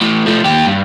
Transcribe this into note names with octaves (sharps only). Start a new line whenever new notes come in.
A2 E3
F3 A3
D#2 G4
G2